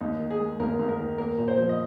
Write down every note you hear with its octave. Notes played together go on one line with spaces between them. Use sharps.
D#2 D#4
D#3
G#4
G#3
D#2 A#4
D#2
A#4
D#3
A#3 A#4
A#2
C5
F3
D#5